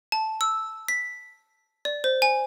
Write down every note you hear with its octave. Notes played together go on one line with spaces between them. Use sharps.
A5
E6
B6
D5
C5
G#5